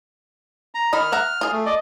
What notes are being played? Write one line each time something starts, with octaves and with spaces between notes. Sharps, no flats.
A#5
D#3 D#5 B5 F6
E5 F#5 A#5
F4 G#4
A3
D5 D#5